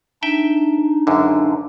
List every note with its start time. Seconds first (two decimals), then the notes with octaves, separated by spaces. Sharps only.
0.23 D4 D#4 E5 G5
1.07 C#2 F#2 D3